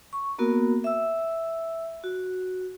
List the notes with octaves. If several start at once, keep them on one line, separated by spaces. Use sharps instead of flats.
C#6
A#3 B3 F#4 A#4
E5 E6
F#4